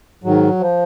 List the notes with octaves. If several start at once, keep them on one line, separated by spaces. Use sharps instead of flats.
G#2 D#3 F#3
F3